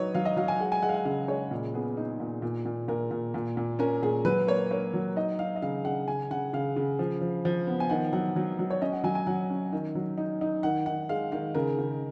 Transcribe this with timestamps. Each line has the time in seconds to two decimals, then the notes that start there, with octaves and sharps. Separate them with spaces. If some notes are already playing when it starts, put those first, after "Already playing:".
Already playing: F#3 D#4 B4 C#5
0.15 F#3 F5
0.25 D#5
0.37 F#3 F5
0.48 G#5
0.60 G#3 F#5
0.72 G#5
0.82 G#3 F#5
0.89 F5
0.94 F#5
1.05 C#3 F5
1.28 G#3 C#5
1.51 A#2
1.74 B3 G#4
1.97 D#4
2.20 A#2
2.42 A#2
2.65 A#2
2.88 A#2 A#4
3.11 A#2
3.34 A#2
3.57 A#2
3.79 C#4 A#4
4.02 A#2 G#4
4.25 F#3 B4
4.47 A#3 C#5
4.71 A#3 C#5
4.94 F#3
5.16 D#4 D#5
5.39 D#4 F5
5.56 D#5
5.62 C#3 F5
5.85 C#3 F#5
6.08 C#3 G#5
6.31 C#3 F#5
6.53 C#3 F5
6.76 C#3
6.99 F3
7.21 F3
7.45 F3
7.67 B3
7.80 G#5
7.90 D#3 F#5
8.13 F#3 F#5
8.36 F#3
8.59 F#3
8.70 C#5
8.81 C#4 D#5
8.92 F#5
9.04 F#3 G#5
9.15 G#5
9.27 F#3 F#5
9.50 C#4
9.73 D#3
9.95 F#3
10.18 D#4
10.41 D#4
10.63 D#3 F#5
10.86 D#3 F#5
11.09 G#3 F5
11.32 D#3 F5
11.55 C#3 A#4
11.78 C#3